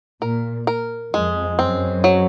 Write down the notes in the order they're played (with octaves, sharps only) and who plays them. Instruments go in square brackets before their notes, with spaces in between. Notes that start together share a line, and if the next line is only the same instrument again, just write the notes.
[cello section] A#2 [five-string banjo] A#4
[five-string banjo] A#4
[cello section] F2 [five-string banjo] G#3
[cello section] F#2 [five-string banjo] C4
[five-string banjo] F#3